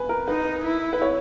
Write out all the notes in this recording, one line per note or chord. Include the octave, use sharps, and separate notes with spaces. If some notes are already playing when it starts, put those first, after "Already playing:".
Already playing: B4 G#5
A#4
D#4 B4
E4
B4
C#5